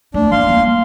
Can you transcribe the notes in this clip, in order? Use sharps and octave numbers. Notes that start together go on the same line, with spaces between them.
A3 D4
A#3 F5 C6
G3 A#3